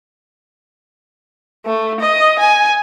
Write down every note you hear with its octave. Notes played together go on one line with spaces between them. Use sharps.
A3
D#5
G#5